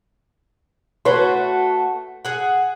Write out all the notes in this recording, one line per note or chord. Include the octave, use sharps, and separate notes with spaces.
A3 F#4 B4 C#5 C6
G#4 F#5